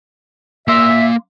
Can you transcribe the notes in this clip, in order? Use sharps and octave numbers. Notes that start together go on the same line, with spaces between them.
A#3 E5 C6